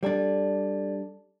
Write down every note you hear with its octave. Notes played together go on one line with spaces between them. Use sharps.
G3 D4 A4 D5 A5